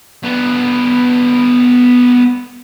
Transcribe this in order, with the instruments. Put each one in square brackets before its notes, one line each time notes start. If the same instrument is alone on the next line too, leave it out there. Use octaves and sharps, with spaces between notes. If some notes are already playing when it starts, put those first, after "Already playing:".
[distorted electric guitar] B3 D4